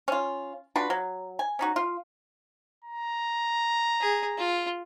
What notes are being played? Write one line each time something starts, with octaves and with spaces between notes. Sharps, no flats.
C#4 F4
D4 F4 F#4 B4
F#3
G#5
C#4 D#4 F#4
F4
A#5
G#4
F4